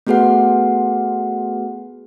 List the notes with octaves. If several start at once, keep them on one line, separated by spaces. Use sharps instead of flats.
A3 B3 F#4 G#4 B4 F#5